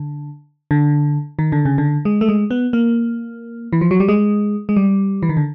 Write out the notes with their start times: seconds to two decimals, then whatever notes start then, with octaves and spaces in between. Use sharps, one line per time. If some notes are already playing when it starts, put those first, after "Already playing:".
Already playing: D3
0.71 D3
1.39 D#3
1.52 D3
1.65 C#3
1.78 D3
2.05 G#3
2.21 A3
2.29 G#3
2.51 B3
2.73 A#3
3.73 E3
3.81 F3
3.91 F#3
4.00 G3
4.09 G#3
4.69 G#3
4.76 G3
5.23 E3
5.29 D#3
5.37 D3